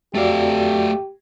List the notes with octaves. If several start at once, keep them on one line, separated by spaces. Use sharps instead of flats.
F2 A3 F#4 G4 D5 F5